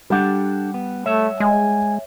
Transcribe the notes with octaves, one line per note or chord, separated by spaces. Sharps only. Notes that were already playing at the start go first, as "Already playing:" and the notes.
G3 D4 G4 A4 F#5
B3
A3 C#5 E5
G#3 G#5